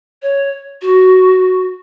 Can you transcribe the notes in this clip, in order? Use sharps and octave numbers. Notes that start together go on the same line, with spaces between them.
C#5
F#4